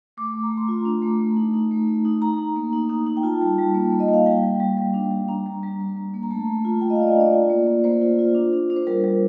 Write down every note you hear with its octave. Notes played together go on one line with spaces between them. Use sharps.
A3 D6
A3
A#5
A3
C6
F4 A#5
D4
A3
A3
D#4
D#4
A3
D#4
D#4
D#4 A#5
D#4
A#3
D#4
D#4
D#4
G5
F4 A5
G3
G3
A#3
A#3
D#5
A#3 F5
G3 G5
G3
G3
G3
D4
G3
D4 A#5
G3
G3
G3
G3
A#3
A#5
A3 A5
A3
F4
F4 G5
D#5
F5
F4 D5
D#5
D4 D5
F4
A#3
A#3
A#3 C5
F4
F4
D4
D4
D4
C5
G3 A#4
G3